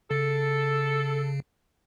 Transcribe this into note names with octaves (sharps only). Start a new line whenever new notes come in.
C#3 A4